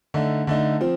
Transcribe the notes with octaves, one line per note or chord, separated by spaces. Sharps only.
D3 A3 D#4
D3 A3 D#4
F3 C4